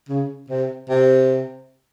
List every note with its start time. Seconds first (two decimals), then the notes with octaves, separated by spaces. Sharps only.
0.09 C#3
0.50 C3
0.90 C3